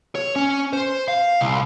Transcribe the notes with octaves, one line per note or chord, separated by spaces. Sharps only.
C#5
C#4
C5
F5
C2